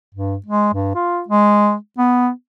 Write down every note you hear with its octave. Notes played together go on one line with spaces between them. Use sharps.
G2
G#3
G2
F4
G#3
B3